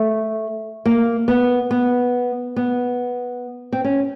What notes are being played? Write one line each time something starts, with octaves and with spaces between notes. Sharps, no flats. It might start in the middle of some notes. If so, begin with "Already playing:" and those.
Already playing: A3
A#3
B3
B3
B3
C4
C#4